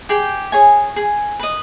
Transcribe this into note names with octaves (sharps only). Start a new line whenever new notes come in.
G4 G#4 G5
G#4 C#5 G#5
G#4
B4 D#5